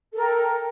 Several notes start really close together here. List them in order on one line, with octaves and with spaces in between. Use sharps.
A4 A#4 G5